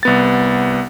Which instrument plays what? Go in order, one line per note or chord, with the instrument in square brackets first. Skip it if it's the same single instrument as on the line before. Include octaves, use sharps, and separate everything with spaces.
[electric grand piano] C2 B3 A6